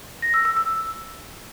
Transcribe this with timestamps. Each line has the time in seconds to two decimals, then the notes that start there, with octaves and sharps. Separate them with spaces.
0.22 A#6
0.34 E6
0.45 E6
0.57 E6